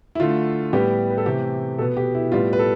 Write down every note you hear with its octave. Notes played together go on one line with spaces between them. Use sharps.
E4
D3 A3 F4
A2 G3 B3 G4
B4
A4
C3 E3 A3 G4
B2 B3 A4
G4
E4
A2 G3 B3 F4
B4
A4